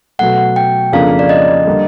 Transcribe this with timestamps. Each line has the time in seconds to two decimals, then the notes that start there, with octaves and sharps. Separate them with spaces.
0.19 B2 F#3 A3 F#5
0.56 G5
0.93 F2 C#3 F3 A#3 D4 F5
1.19 D5
1.29 D#5
1.67 D3 G3 A#3